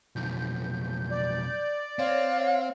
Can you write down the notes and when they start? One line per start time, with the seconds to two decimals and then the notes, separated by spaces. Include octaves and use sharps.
0.16 B1 F2 G6
1.11 D5
1.99 C4 C#5 F5